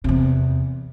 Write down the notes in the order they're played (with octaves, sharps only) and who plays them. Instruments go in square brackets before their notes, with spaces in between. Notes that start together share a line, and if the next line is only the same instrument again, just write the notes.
[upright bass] E2 C3